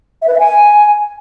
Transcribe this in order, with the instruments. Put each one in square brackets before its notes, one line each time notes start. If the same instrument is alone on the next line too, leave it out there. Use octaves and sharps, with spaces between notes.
[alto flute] E5
B4
E5
G#5